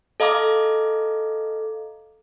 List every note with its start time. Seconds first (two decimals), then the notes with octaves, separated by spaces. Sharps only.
0.20 A4 D#5 F5 A#5 D6